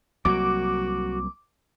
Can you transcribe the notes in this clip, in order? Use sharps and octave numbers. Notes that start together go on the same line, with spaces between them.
C2 F#3 A#3 F#4 D6